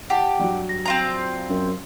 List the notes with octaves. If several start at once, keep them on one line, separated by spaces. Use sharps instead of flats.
G4 F#5 G5 A5
G2 F#3
A#6
C4 F4 A#5
F#2